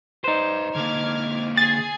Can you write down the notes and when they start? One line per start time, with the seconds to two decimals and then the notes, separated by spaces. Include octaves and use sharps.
0.24 D#4 B4 C5 D5
0.75 D3 A#3 D6 F6 G#6
1.57 G#4 G#5 A6 C7